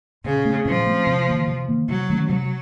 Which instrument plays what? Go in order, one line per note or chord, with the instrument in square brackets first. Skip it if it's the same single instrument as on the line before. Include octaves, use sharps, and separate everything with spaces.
[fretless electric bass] A#2 [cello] C#3
[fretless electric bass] A3 C4
[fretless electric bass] A#2 [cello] F3
[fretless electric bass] A3 C4
C3
D#3 A#3
C3
D#3 A#3
[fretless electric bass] C3 [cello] F#3
[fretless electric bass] D#3 A3 C#4
[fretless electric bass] C3 [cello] F#3